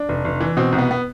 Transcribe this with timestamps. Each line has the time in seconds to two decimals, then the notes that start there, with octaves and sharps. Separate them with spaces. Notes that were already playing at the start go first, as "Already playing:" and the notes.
Already playing: D4
0.09 F1
0.25 F1
0.41 E3
0.57 B2 C4
0.72 C2
0.78 B3
0.91 B3